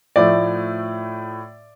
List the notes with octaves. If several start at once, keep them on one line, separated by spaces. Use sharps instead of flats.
A2 F3 A3 D5